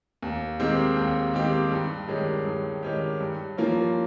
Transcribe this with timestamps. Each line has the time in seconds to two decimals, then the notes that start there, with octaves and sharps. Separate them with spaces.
0.22 D#2
0.59 D#3 G#3 C4 G4
0.97 D#2
1.34 D#3 G#3 C4 G4
1.72 G2
2.09 D#3 G#3 C#4 G4
2.46 G2
2.83 D#3 G#3 C#4 G4
3.20 G2
3.58 F3 A#3 C#4 F4